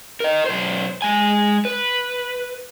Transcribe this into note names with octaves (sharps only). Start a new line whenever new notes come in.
A#4 D#5
B1 C5
G#3 G#5
B4